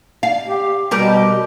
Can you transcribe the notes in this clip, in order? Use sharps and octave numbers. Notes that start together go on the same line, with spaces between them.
F5
G4
B2 G3 G4 A#4